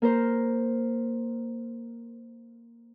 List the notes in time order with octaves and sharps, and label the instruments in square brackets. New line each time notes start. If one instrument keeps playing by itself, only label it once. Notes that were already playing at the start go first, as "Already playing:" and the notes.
[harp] A#3 A#4 C5